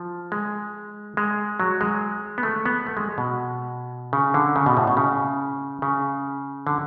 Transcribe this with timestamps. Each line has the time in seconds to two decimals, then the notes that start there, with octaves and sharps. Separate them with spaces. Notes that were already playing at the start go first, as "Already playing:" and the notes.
Already playing: F3
0.32 G#3
1.17 G#3
1.60 F#3
1.81 G#3
2.38 B3
2.43 A3
2.66 B3
2.87 A3
2.97 G#3
3.18 B2
4.13 C#3
4.34 D3
4.56 C#3
4.66 B2
4.77 A2
4.87 B2
4.97 C#3
5.82 C#3
6.67 D3